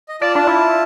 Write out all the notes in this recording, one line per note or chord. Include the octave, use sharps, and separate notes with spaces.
D#5
F4 D5 A5
D4
E4